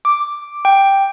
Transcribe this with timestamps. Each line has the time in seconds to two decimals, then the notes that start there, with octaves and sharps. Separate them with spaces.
0.05 D6
0.65 G5